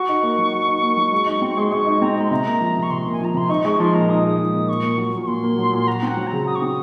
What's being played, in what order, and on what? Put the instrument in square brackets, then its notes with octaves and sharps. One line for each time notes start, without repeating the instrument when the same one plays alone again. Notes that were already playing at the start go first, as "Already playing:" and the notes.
Already playing: [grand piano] F#4 [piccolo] C#6
[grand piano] D#4
A#3
F#3
F#4
D#4
A#3
F#3
G#3
D#4
C4
[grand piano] G#3 [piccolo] C6
[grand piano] G#3 [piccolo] C#6
[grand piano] D#4
[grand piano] C4 [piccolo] A#5
[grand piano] G#3 [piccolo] C6
[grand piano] C3 [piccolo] A#5
[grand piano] A#3
F3
C3
[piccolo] C#6
[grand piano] C3 [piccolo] C6
[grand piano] A#3
[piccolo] G#5
[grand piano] F3 [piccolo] A#5
[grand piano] C3 [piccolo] C6
[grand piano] D#4 [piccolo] C#6
[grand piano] G#3 [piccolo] C#6
[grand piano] F3 [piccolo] C6
[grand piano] A#2 [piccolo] A#5
[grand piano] D#4 [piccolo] D#6
[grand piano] G#3
F3
A#2
[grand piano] A#2 [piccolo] C#6
[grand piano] A#3
F#3
A#2
[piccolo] C#6
[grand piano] A#2 [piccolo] C6
[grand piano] A#3
F#3
A#2
[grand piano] F#4 [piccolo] A#5
[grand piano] C4
[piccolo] F#5
[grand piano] F#3
[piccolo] A#5
[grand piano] C#3
[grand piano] F#4 [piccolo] D#6
[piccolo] C#6
[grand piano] C4 [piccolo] D#6